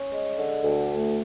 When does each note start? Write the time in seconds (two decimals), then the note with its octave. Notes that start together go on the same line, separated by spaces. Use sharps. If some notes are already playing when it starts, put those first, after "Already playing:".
Already playing: C#4
0.12 G#3
0.37 D3
0.63 D2
0.88 A3